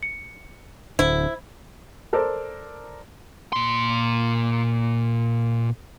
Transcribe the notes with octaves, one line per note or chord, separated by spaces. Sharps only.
C#7
D1 D3 E4 C5
A4 A#4 C5 D5
A#2 C6